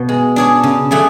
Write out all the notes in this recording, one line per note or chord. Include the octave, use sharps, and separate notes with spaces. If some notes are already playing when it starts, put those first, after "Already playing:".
Already playing: B2 B3
G#3
D4 G#4 C#5
C#3
F#3 A3 D4 G#4